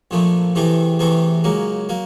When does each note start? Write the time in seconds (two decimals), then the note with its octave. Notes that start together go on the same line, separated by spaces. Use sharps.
0.11 A#1 A#2 F3 A3
0.55 E2 C3 E3 A3 C4
0.99 E2 C3 E3 A3 C4
1.44 C#2 C#3 F#3 A#3
1.89 F#3 A#3